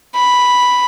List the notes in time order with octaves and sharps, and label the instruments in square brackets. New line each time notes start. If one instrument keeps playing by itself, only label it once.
[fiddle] B5